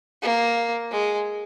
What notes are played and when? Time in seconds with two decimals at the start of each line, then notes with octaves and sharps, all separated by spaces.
0.23 A#3
0.92 G#3